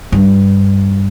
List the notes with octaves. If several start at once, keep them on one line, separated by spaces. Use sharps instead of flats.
G2